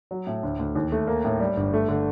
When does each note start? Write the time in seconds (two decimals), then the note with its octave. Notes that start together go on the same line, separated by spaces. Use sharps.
0.11 F#3
0.27 A2
0.43 D2
0.59 D2
0.75 D#2
0.92 A3
1.08 A#3
1.25 A2
1.40 G3
1.57 G1
1.74 A3
1.89 D3